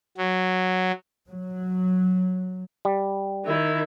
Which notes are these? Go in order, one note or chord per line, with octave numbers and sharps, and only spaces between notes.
F#3
F#3
G3
D#3 E4